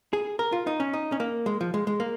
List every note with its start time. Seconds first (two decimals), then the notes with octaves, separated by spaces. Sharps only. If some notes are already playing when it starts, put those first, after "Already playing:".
0.13 G#4
0.39 A#4
0.52 F4
0.67 D#4
0.80 C#4
0.93 D#4
1.12 C#4
1.20 A#3
1.46 G#3
1.61 F3
1.74 G#3
1.87 G#3
2.00 A#3